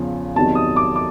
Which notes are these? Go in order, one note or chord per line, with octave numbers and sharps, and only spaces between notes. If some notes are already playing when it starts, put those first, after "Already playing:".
Already playing: E2 C#3 F3
E2 C3 D#3 F#3 A5
D#6
D6
D6